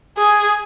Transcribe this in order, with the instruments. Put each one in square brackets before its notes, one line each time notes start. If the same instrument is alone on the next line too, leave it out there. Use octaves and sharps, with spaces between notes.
[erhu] G#4